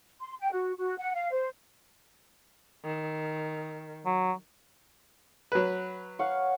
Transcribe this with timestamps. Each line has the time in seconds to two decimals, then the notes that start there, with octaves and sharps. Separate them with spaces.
0.21 C6
0.40 G5
0.52 F#4
0.78 F#4
0.98 F#5
1.15 F5
1.32 C5
2.85 D#3
4.06 F#3
5.52 F#3 B4
6.19 C#5 F5 F#5